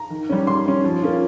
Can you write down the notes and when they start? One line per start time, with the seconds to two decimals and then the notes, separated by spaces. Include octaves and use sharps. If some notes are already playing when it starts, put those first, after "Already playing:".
Already playing: A#5
0.10 D#3
0.29 G3 C#4
0.47 D#3 C6
0.66 G3 C#4
0.84 F3
1.02 A#3 C#4 F4